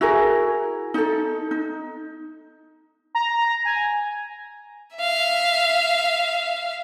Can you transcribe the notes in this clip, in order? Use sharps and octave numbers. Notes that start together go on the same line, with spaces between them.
E4 F#4 G#4 A#4
D#4 A4
D#4
A#5
G#5
E5 F5